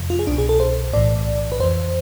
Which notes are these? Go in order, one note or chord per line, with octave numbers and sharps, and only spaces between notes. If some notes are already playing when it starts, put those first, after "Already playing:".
Already playing: F2 C3 F3
F4
G#4
C2 B2 D4
G#4
A4
C5
B1 A2 E3 D5
B4
F2 E3 C5